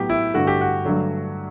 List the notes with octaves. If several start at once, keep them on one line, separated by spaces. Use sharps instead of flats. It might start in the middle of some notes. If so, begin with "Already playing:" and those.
Already playing: A2 F#3 B3 G4
E4
G2 D3 A3 F#4
G4
F#4
G2 D3 F#3 A3